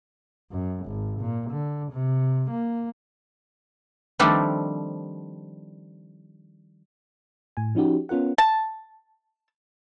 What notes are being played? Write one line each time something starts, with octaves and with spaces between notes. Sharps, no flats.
F#2
G#1
A#2
D3
C3
A#3
D#3 F3 G3 A3 C4 D4
A2 G#5
F3 C#4 D#4 F#4 G4
B3 C#4 F4 A#4 F#5
A5